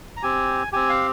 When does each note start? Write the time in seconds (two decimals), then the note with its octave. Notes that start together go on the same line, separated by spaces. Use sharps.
0.17 A#5
0.23 C4 G4 G#5
0.73 C4 G4 G#5
0.90 F5